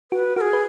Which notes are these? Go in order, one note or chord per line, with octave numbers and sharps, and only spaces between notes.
F#4 B4
F#4 G#4 A#4
B4